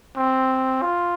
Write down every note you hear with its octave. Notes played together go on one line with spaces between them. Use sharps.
C4
F4